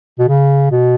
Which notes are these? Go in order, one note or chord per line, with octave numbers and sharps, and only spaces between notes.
B2
C#3
B2